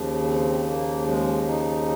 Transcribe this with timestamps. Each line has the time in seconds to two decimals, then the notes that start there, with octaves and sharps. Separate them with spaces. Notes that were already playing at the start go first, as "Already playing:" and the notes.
Already playing: D#2 C#3 F3
0.25 C4
0.67 A#3
1.07 G#3
1.48 D#4